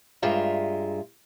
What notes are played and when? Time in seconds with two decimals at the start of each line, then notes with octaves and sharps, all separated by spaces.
0.22 G2 G#3 F4 E5 A#5